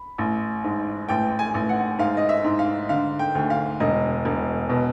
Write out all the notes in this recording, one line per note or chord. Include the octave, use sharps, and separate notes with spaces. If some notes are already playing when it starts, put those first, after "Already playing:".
Already playing: B5
A1
G#2
A1 G5
G#5
A1
F#5
G#2 F5
D#5
E5
G#2
F5
D3 F5
G5
D2
F5
E1 D#5
E1
B2